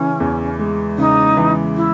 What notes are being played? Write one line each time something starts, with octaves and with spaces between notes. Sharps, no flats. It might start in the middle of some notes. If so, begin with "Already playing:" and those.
Already playing: C#3 E3 C#4
E2
G#3
C#3 D#4
E3
E4